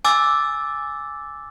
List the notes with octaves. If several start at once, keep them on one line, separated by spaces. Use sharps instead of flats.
G#5 D6 E6 A6